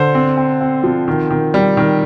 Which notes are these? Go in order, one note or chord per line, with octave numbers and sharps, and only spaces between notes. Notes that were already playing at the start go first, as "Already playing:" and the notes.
Already playing: D3 C5
C4
C4
C4
F3
D#3
D#3
G3
D#3